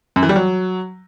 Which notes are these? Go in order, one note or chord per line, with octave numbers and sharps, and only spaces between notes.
F#2
E3
G3
F#3